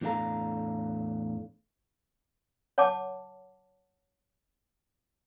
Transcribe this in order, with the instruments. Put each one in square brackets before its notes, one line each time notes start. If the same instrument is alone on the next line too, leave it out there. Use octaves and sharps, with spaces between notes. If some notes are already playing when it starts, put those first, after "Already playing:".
[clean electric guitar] E2 A2 D4 A4 F5 A#5
[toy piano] C#5 F#5 A5 D6